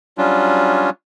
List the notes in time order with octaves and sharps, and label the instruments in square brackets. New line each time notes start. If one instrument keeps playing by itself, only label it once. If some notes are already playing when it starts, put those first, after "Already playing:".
[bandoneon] F#3 G3 C#4 D4 F4